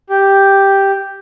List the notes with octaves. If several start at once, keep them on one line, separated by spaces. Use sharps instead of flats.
G4